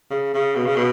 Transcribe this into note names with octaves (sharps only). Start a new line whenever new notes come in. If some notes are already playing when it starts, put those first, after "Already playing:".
C#3
C#3
B2
C#3
B2